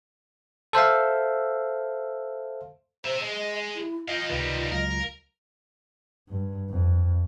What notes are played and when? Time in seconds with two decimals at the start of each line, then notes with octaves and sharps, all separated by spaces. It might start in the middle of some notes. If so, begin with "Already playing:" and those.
0.73 A4 C5 E5 F5
3.05 C4 C5 E5
3.21 G#3 D#5
3.75 E4
4.08 F4 D#5 F5 G5
4.30 C#2 C3 D#3 G3 B4
4.72 C#2 F#3 A#4 F5
6.29 G2
6.70 F2